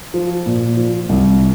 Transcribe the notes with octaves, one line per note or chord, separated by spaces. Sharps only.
F3
A#2
F3
C2